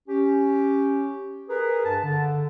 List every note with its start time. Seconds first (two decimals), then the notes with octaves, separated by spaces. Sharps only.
0.08 C#4 G4
1.49 G#4 A#4 B4
1.85 G2 A5
2.03 D3